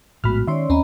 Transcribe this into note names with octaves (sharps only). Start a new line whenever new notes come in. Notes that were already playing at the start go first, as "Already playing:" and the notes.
A#1 A2 G#3 B3 F#4 B5 F6
D#3 C#4 C#5 D5 E5 C6
D#2 C4 C#4 D#5 A#5 B5